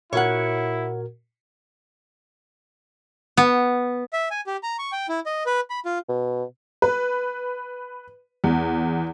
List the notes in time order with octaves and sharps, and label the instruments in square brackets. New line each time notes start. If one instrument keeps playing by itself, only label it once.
[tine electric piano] A#2 F#4 A#4 [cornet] E4 [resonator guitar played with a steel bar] C#5 F#5
[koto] B3
[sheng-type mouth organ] E5
G#5
G4
A#5
C#6
G5
E4
D#5
B4
B5
F4
[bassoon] B2
[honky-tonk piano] B4
E2